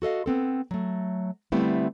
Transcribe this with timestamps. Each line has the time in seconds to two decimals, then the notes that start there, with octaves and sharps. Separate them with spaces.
0.02 F#4 A4 D#5 F5
0.26 B3 C4 A4
0.71 F#3 A3
1.52 D3 G3 A3 B3 C4 E4